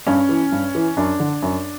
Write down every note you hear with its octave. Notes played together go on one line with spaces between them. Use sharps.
G2 C#4
E3
G2
E3
F#2 D4
D3
F#2